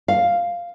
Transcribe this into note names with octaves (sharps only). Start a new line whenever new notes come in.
F5